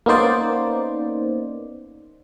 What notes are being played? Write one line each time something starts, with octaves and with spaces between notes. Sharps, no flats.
A#3 B3 C#4 D#4 C5 D5